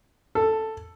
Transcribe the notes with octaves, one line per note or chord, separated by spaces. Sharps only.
A4